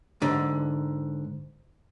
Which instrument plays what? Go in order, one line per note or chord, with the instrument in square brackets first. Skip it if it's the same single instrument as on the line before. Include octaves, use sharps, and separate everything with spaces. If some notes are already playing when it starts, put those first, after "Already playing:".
[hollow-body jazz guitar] G#2 D3